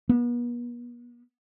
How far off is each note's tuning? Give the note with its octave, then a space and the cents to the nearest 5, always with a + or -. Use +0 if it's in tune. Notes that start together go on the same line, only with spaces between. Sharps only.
B3 -40